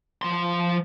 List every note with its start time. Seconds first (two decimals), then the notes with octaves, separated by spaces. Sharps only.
0.22 F3 C6